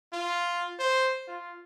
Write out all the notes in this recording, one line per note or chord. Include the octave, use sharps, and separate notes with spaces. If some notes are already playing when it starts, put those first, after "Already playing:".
F4
C5
F4